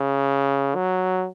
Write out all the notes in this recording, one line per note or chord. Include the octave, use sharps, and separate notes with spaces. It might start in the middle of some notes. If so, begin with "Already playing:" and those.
Already playing: C#3
F#3